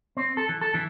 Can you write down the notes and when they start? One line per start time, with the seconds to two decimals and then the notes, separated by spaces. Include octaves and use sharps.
0.17 C4
0.37 A4
0.49 E3
0.61 A4
0.74 E3